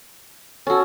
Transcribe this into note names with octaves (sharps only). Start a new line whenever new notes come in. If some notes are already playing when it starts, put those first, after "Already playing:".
C#4 F#4 A4